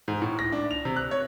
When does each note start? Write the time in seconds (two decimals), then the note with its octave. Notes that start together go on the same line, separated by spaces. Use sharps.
0.08 G#2
0.22 A2
0.39 A#6
0.52 D4
0.71 F7
0.85 C3
0.96 F#6
1.11 C#5